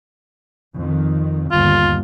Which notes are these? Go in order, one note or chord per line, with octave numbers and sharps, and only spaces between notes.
F2 D#3
G1 D#2 D3 F4